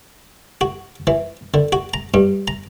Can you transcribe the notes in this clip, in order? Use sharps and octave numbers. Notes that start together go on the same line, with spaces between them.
F#4
E3
D3
F#4
A#5
G2
A#5